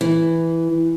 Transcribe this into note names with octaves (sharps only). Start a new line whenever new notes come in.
E3